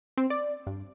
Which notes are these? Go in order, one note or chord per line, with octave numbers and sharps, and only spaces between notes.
C4
D5
G2